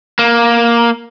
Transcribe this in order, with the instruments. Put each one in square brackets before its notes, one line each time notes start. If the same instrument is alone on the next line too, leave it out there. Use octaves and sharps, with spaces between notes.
[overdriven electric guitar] A#3